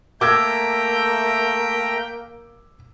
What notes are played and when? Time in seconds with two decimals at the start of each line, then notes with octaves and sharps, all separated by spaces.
0.21 A3 A#3 E5 G5 A#5 D6 E6 G#6